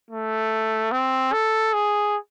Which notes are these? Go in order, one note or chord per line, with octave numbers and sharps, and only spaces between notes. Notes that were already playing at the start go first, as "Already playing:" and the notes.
A3
C4
A4
G#4